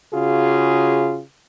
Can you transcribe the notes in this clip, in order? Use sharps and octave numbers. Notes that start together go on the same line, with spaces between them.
C#3 F4 F#4 G#4